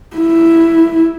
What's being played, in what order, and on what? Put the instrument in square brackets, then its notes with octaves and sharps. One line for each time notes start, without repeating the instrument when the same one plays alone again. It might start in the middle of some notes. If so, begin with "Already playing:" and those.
[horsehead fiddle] E4